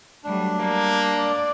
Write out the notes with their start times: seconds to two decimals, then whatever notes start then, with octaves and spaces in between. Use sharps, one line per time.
0.24 F#3 G3 A3 D4
0.59 G3 A#3
1.18 D5